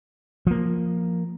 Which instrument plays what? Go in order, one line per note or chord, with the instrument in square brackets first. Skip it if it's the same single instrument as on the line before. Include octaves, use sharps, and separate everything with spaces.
[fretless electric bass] F3 A#3